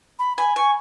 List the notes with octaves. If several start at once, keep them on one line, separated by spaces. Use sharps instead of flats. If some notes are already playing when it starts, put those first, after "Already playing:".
B5
G#5 B5
G#5 C#6